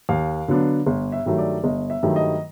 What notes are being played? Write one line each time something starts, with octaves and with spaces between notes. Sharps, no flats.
D#2 F5
D3 F#3 B3 D4
G1
E5
G2 D#3 F#3 A3
D5
G1 D#5
E5
G2 D#3 F#3 A3
D#5